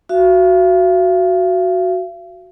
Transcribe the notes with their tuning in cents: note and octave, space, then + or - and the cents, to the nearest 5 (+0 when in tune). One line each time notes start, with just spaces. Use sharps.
F#4 +0 F5 -45